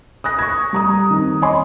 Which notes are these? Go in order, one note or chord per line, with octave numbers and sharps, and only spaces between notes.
D#6 F#6 A#6
C#6 G#6
G3 A#5 D#6
D#3 C4
C#5 D#5 G#5 B5 C6 D6